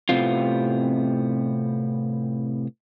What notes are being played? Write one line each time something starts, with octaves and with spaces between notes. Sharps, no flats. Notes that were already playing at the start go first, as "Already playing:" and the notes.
A2 C3 B3 C4 F4